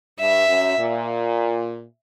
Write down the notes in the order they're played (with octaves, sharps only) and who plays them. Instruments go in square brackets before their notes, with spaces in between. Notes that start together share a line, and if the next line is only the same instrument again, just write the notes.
[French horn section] G2 [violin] E5
[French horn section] F#2
A#2